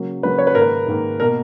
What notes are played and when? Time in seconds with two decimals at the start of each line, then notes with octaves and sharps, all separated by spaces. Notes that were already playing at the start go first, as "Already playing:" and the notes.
Already playing: C#3 F#3 A#3
0.23 C#3 F#3 A#3 B4
0.38 C#5
0.47 B4
0.55 G#2 D#3 A#3 A#4
0.62 B4
0.87 G#2 D#3 A#3
1.20 B2 A#3 A#4